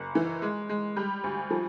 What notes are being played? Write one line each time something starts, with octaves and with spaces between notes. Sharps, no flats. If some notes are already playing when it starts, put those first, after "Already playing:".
Already playing: F#1
E3
G#3
G#3
G3
D2
F3